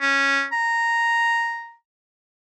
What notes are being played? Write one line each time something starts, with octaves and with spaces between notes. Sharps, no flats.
C#4
A#5